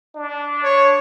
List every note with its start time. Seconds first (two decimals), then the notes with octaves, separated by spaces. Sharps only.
0.16 D4
0.64 C#5